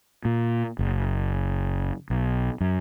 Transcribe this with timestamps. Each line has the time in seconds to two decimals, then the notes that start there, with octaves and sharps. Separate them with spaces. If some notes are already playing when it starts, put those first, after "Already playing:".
0.25 A#2
0.79 F#1
2.10 B1
2.60 F#2